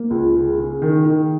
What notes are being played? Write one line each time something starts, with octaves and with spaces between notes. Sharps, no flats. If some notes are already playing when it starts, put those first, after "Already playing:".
Already playing: A#3
C#2
C#3
C#3
D#3
D#3